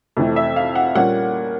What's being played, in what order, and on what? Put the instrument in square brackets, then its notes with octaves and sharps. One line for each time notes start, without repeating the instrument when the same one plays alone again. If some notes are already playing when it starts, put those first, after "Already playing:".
[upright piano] F2 C3 E3 A3
E5
F5
F#5
A#2 G3 A#3 C#4 F#5